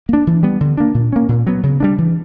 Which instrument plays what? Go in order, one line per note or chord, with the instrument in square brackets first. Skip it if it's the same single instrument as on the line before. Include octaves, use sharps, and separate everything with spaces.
[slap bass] A#3 D4
E3
G3 B3
D3
A#3 D4
A#2
A#3 C#4
A#2
F#3 B3
C#3
G3 A#3 D4
E3